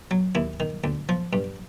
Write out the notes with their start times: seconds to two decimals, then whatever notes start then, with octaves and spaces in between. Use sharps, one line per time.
0.11 F#3
0.35 D#2 E4
0.60 D#3
0.84 D2
1.09 F3
1.33 G2